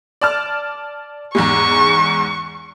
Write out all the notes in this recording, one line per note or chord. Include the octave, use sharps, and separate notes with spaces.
D5 A5 F6
E2 G#2 G#3 C#6